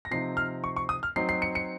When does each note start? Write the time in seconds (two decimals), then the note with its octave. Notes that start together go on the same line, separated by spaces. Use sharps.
0.05 A#6
0.11 C3 F3 C4 D#4 C7
0.37 F6
0.64 C#6
0.76 C#6
0.89 D#6
1.03 F6
1.16 F#3 C4 D#4 C7
1.29 C7
1.42 C#7
1.55 C#7